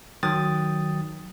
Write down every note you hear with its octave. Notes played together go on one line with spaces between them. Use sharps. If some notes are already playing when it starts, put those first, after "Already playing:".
D#3 F#3 G5 D#6 A6